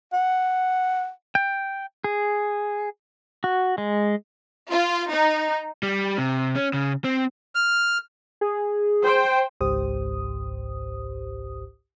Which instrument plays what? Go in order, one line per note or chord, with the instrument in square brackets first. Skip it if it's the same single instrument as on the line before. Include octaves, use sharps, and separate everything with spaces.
[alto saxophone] F#5
[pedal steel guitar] G5
G#4
F#4
G#3
[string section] F4
D#4
[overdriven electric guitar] G3
C3
C#4
C#3
C4
[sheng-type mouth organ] F6
[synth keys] G#4
[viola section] C5 G5
[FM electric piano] G#1 C#2 G#2 G4 C5 D#6